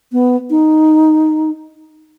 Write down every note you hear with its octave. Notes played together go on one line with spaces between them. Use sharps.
B3
D#4